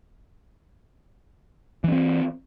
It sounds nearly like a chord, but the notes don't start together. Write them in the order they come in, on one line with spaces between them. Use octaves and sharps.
E3 C#4 C4